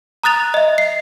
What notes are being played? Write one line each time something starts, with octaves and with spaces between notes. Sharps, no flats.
A#5 D#6 F#6 A6 F7
D#5 E5
C7